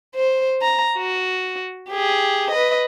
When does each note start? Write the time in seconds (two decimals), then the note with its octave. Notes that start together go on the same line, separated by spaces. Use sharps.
0.15 C5
0.62 A#5
0.98 F#4
1.90 G4 G#4
2.51 B4 D#5